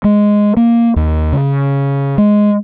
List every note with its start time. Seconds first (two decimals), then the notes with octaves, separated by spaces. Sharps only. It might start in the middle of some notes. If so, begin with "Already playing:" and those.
0.04 G#3
0.57 A#3
0.96 D#2
1.32 C#3
2.18 G#3